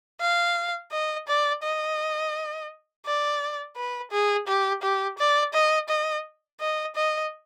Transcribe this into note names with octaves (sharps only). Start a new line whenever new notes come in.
F5
D#5
D5
D#5
D5
B4
G#4
G4
G4
D5
D#5
D#5
D#5
D#5